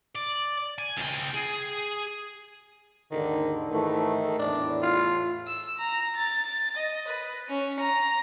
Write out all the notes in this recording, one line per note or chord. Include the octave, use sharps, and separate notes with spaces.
D5
G#5
C#2 G5
G#4
D#2 G#2 D3 D#3
G#2 D#3 E3 A3
E2 A2 D4
F4
E6
A#5
A6
D#5
B4
C#4
A#5